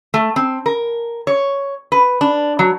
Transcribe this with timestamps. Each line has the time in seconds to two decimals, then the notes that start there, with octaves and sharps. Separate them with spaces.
0.14 A3
0.36 C4
0.66 A#4
1.27 C#5
1.92 B4
2.21 D4
2.59 F#3